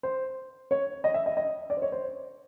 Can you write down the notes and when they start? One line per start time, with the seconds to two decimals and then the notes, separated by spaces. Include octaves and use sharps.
0.03 C5
0.71 C#5
1.04 D#5
1.14 E5
1.26 D#5
1.37 D#5
1.70 D5
1.77 C5
1.82 C#5
1.92 C5